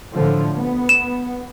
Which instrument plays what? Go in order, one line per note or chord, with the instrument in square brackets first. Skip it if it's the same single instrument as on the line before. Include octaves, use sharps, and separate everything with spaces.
[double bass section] A2 D3 F3
B3
[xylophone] E7